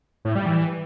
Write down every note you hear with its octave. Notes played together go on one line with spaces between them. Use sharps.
A2
G3
E3